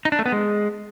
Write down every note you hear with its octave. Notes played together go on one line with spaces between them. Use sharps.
D#4
D4
A3
B3
G#3